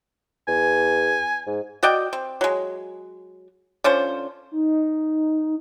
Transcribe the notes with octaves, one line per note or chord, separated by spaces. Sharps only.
E2 G#5
G#2
F#4 D5 D#5 G5
C4
F#3 G#3
D3 C#4 F4 C5
D#4